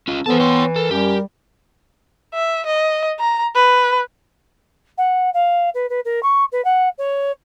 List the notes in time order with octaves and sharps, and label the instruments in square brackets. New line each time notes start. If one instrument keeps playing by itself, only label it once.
[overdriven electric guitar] C#4 F4
[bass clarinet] E3 [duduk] B3 [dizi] A4 [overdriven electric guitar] C5 A5
[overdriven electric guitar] C#5 G5 [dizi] C6
[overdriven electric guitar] A4 [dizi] A#4
[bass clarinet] F#2 [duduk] G3 [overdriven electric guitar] G4
[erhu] E5
D#5
A#5
B4
[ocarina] F#5
F5
B4
B4
A#4
C#6
B4
F#5
C#5